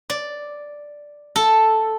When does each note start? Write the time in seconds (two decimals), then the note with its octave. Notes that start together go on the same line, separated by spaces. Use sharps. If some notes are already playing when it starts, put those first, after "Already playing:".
0.10 D5
1.36 A4